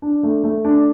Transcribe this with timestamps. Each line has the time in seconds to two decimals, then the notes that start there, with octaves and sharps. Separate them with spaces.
0.02 D4
0.23 A3
0.44 A3
0.65 D4